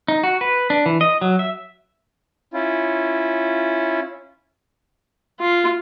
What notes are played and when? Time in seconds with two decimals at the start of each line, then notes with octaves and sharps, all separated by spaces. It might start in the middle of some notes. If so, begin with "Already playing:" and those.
0.08 D#4
0.23 F#4
0.41 B4
0.70 D4
0.86 E3
1.01 D#5
1.21 F#3
1.39 E5
2.54 C#4 E4 F4
5.40 F4